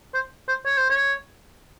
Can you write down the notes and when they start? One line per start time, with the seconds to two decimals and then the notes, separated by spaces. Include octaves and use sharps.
0.14 C5
0.48 C5
0.66 C#5
0.78 C5
0.90 C#5